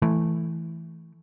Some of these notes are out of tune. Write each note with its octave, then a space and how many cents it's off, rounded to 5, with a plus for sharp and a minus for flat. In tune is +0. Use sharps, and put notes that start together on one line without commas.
E3 +0 A3 +0